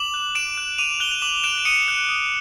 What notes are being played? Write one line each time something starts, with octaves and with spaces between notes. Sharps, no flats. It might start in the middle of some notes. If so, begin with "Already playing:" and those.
Already playing: D6 E7 F#7
F#6
D6 D7 E7
F#6
D6 D#7 F7
F#6 F7 G7
F7
D6 E7 F#7
F#6 D7 E7
D7
D#6 C#7 D#7
F#6
D#6